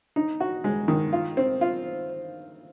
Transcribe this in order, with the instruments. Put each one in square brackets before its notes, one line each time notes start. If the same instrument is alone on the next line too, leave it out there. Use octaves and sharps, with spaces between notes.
[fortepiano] D#4
F#4
G#3
D#3
F4
C4
F4